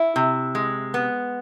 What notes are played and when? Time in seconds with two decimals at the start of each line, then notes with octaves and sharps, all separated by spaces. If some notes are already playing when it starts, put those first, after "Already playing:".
Already playing: E4
0.16 C3
0.55 G#3
0.94 B3